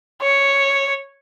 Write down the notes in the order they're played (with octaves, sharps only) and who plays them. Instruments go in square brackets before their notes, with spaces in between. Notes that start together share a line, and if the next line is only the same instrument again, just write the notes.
[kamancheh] C#5